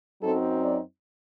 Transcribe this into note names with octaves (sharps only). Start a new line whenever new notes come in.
F#2 F#3 C4 D#4 A4
D5